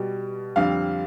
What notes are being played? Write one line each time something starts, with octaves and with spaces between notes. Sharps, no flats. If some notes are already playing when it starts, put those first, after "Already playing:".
Already playing: B2 G3
F2 D3 G3 F5